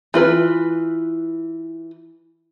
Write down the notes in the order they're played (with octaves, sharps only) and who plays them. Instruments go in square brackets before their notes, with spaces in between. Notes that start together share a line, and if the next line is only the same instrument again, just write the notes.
[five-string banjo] E3 F4 B4